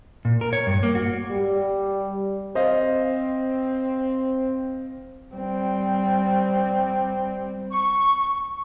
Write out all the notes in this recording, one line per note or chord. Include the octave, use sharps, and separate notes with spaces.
A#2
A#4
C#5
G2
A#3
F#4
G3
C4 C5 D#5 F5
G3 C4
C#6